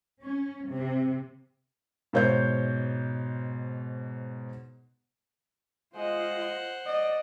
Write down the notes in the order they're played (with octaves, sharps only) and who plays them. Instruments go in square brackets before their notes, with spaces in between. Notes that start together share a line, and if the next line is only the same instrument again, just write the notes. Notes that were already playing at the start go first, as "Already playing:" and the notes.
[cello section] C#4
C3
[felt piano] G#2 B2 C5 C#5 G6
[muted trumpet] G#3 [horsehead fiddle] F4 D#5 [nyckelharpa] C5 F#5
[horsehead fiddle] D5 [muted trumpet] D#5